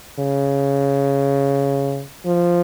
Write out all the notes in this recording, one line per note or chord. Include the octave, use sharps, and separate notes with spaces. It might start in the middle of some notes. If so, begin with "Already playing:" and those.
C#3
F3